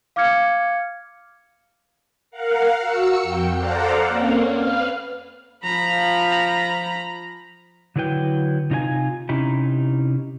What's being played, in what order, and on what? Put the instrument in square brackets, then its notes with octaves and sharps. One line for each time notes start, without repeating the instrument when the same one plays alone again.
[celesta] F5 D6 F6 G#6 C#7
[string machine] A#4 F5 F#5
F#4 E6 C#7
F2 G5
A4 C5 D5 F5 F#5 A#5
A#3 C4 C#4
B4 F5 F6
[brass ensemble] F3 [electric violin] A#5 B5
[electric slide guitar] D3 F#3 E4 B4 G5
C3 D#4 F4 C5 G#5
C3 C#4 D#4 E4 G4